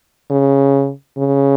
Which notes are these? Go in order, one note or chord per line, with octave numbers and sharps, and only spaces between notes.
C#3
C#3